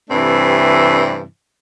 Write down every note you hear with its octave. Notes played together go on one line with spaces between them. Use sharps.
G2 C3 E3 A3 C4 D4